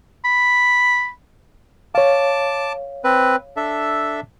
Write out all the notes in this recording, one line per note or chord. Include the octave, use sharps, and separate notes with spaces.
B5
C#5 F5 A5 D6
C4 B4
D4 A4 E5